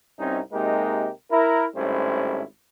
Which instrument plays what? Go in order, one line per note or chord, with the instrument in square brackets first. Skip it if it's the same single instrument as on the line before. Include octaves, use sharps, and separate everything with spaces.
[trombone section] C2 G2 C4 C#4 D#4
C3 G#3 A#3 D#4 G4 A#4
E4 A#4
G#1 A2 G3 C#4 E4 C5